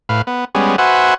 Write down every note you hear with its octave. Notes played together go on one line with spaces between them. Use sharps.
A2 B4 F5
B3
G3 G#3 B3 C#4
F#4 B4 C5 E5 F#5 G#5